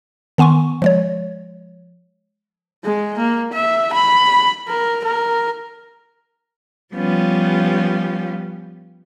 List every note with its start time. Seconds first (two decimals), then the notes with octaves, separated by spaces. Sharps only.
0.38 D#3 B3 G#5 C6 C#6
0.82 F3 G#3 C#5
2.84 G#3
3.18 A#3
3.53 E5
3.93 B5
4.68 A#4
5.04 A#4
6.93 F3 G3 B3 C#4 F4 G4